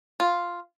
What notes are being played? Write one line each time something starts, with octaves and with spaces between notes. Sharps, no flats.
F4